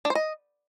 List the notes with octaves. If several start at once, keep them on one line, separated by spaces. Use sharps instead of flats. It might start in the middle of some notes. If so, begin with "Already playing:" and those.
D4
C5
D#5